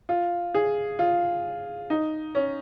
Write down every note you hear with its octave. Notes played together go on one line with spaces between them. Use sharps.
F4
G#4
F4
D#4
C#4